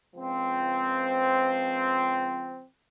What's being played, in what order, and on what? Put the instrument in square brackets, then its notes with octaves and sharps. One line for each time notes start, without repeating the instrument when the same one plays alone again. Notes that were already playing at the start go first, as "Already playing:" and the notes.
[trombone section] C#2 F3 C4